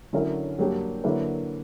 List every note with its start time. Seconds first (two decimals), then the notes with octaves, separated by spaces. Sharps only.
0.13 D3 F#3 C#4 E4 A#4
0.59 G2 F#3 A#3 D4 G4
1.04 D3 F#3 A#3 E4 B4